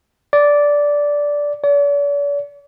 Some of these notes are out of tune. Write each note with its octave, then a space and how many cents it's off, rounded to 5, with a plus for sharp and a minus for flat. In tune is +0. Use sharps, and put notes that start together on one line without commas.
D5 -10
D5 -45